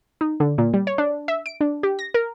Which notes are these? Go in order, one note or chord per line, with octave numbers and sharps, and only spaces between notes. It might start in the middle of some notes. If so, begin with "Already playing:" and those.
D#4
D3
A#2
G3
C#5
D4
E5
D7
D4
G4
A#6
A#4